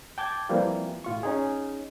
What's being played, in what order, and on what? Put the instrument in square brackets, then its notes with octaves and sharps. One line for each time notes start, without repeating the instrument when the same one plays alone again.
[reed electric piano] G5 A5 D6 G6 G#6
E3 F3 G3 A#3 C4 F4
A2 F4 C#6
C#4 D#4 G#4